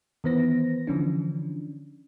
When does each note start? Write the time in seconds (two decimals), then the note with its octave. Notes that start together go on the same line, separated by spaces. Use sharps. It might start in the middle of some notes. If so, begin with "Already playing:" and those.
0.24 D#3 E3 B3 C5 A#6
0.87 D3 E3 F3 C#4 D4